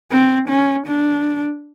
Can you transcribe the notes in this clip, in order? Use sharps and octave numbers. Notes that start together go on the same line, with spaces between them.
C4
C#4
D4